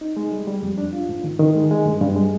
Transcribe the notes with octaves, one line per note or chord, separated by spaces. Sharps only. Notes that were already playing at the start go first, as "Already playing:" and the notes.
D#4
G#3
G3
G3
F2
D4
F4
G#2
D#3
D#3
G#3
G#3
G2
G2
G#3